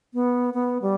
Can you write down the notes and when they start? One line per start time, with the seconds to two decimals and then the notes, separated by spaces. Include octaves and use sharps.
0.14 B3
0.54 B3
0.82 G3